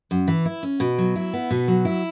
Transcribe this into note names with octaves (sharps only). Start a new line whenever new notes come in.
F#2
E3
E4
C#4
B2
F#3
E4
B3
B2
F#3
E4